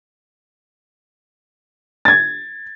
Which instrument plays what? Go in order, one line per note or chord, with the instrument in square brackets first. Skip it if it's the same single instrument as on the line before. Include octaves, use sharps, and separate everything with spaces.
[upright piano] G#6 A6